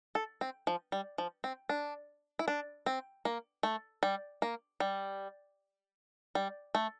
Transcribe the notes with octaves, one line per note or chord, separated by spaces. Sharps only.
A4
C4
F3
G3
F3
C4
D4
E4
D4
C4
A#3
A3
G3
A#3
G3
G3
A3